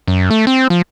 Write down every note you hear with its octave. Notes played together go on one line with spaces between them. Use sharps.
F#2
A3
C4
F3